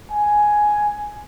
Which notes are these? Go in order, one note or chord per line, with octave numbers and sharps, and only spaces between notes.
G#5